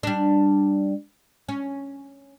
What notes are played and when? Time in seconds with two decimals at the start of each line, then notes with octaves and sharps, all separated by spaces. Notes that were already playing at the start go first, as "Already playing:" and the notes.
0.03 G3 D4
1.49 C#4